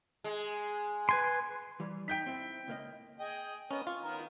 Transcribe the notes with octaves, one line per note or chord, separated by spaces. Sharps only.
G#3
B4 G#5 C6
E3 G3
D#4 G5 G6 B6
C4 E4
C#2 A#3 D#5
G#4 D#5 G5
B3 C#4 A#4 D#5
F4 C#6
D#3 B3 A#4